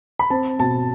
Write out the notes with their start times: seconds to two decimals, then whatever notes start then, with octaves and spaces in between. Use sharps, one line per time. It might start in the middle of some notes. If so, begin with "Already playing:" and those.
0.19 B5
0.30 C4 A5
0.59 B2 A5